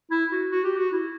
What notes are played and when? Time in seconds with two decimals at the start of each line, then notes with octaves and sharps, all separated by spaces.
0.11 E4
0.32 F#4
0.51 F#4
0.64 G4
0.77 F#4
0.92 E4